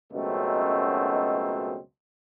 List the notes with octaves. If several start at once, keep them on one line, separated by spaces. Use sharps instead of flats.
C#2 F#2 B2 A3 C4 D#4